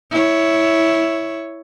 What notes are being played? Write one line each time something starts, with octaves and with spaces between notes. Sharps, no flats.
E4 C#5